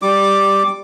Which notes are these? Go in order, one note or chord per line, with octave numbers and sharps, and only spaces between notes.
G3 D6